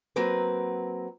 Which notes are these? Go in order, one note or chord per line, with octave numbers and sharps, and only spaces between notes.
F#3 A#3 C4 B4